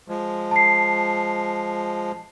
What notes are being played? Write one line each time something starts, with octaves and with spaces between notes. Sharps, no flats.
F3 G#3
A5 C7